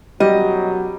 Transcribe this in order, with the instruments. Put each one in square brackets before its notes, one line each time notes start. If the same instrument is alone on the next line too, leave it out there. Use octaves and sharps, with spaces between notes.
[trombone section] F#2 B2 F#3 [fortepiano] G3 [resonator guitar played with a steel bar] D#5